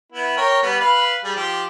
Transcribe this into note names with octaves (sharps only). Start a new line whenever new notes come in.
B3 E4
A#4 C#5 G5
G3 B3
B4 F5 B5
G3 G#4
F3 G4